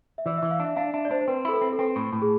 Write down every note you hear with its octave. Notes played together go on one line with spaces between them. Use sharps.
E5
E3 D5
E5
E3
F5
D4 E5
D4 F5
D4 E5
D5
D4 C5
C5
C4 B4
E4 A4
B4
C4
A4
C4 B4
A2
A2
G#4